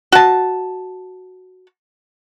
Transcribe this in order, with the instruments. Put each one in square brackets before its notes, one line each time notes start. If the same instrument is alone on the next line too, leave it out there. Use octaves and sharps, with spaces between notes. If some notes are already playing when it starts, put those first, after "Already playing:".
[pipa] F#4 A5